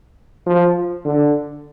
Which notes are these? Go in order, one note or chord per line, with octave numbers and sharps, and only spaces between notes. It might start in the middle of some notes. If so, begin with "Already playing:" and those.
F3
D3